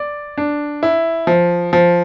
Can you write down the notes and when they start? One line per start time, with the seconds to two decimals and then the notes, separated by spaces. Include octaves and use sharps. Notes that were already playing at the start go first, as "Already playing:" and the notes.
Already playing: D5
0.38 D4
0.83 E4
1.27 F3
1.73 F3